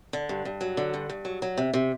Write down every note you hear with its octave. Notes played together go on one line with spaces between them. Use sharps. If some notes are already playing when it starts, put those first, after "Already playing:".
D3
G2
G2
F#3
D3
G2
G2
F#3
F#3
C3
C3